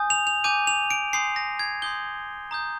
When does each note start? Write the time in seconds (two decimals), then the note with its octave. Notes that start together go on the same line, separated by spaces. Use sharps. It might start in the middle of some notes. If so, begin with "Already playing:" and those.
Already playing: G#5 D#6 G6
0.10 F7
0.27 F7
0.44 G#5 D6 G6 D#7
0.67 F7
0.91 D7
1.13 G#5 C6 D#6 G6 C7
1.36 A#6
1.59 G#6
1.82 C6 D#6 G6 G7
2.51 A#5 D#6 G6